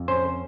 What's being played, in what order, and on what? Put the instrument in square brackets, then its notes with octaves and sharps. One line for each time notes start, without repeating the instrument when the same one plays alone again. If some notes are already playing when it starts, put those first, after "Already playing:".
Already playing: [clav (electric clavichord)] F2
C#4 C5